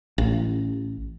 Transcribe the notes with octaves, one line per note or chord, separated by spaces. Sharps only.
A1